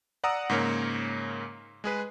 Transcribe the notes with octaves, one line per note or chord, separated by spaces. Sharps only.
D5 F#5 A#5 D#6 E6
G#2 C#3 A#3 A#4 C#5
G#3 G#4 B4